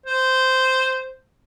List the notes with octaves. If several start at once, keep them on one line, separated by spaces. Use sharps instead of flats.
C5